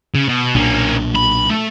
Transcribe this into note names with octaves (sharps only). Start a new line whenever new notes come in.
C#3
B2
B1 A#2 A#3 C#4 D4
B5
A3